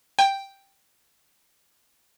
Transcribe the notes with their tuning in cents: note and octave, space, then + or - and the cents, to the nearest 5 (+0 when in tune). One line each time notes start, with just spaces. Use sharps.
G5 +0